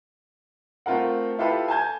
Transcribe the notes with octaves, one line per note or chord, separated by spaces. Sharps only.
A3 C4 F4 A#4 F#5
E4 F4 G4 A4 B4
G#5 A5 G6 G#6